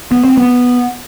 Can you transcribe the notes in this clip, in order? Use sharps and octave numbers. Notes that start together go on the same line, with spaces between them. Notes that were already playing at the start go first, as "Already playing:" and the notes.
B3
C4
B3